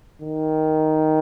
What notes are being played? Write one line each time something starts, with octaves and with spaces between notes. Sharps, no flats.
D#3